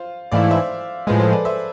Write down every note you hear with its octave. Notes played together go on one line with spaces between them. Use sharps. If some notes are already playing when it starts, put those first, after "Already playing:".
Already playing: F4 C5
G#2 E3 A3 E4 D5 F5
C5 E5
A2 F3 G#3 G#4 B4
A4 C5
B4 D5
C5 E5